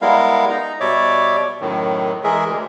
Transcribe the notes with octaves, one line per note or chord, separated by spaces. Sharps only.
G3 G#3 B3 E4 A#4 F5
D#4 A#5
B2 G3 C#5 D5 E5 D6
F#2 A2 D#3
E3 G#3 G#4 A#4 E5
D2